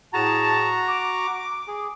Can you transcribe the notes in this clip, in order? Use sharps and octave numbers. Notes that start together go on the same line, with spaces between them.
A2 F#4 G#4 A5 A#5
D6
G#4